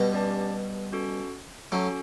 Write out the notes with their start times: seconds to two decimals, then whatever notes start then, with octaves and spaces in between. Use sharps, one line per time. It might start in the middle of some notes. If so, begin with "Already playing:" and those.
Already playing: G2 B2
0.13 C#4 G4 D5 A5
0.92 C#4 F#4 A4
1.72 F#3 A3 C#4 F#4 A4